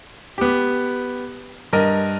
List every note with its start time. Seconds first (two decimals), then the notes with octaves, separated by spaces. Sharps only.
0.38 B3 G4
1.73 G2 A#4 D#5